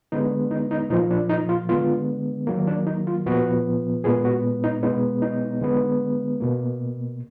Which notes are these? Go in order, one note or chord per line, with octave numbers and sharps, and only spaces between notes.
D3 G#3 B3 D#4
D#4
D#4
A#2 F3 A#3 D#4
D4
D#4
F4
D3 G#3 B3 F4
D#3 F#3 A#3
D4
D#4
F4
A#2 F3 B3 F#4
A#2 G#3 B3 G#4
F#4
D#4
B2 G#3 B3 D#4
D#4
D3 G#3 B3
B2 A#3